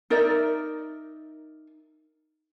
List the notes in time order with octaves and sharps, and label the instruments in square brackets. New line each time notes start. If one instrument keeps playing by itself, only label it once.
[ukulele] D#4 A#4 D5 E5